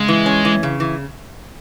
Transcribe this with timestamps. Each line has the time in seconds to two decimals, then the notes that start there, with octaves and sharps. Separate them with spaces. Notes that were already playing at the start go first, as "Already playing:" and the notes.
Already playing: C#3 G#3
0.08 E3
0.26 C#4
0.45 E3
0.63 C#3
0.80 E3